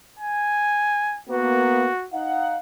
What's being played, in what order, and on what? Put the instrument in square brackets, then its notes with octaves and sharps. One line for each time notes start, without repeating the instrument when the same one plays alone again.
[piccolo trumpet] G#5
[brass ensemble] A#3 B3 [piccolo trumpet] F#4
[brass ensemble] D#4 F5 F#5